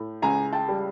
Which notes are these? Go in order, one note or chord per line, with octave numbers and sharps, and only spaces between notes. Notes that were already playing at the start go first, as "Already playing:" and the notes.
Already playing: A2
C#2 G#5 A#5
G5 A5
G3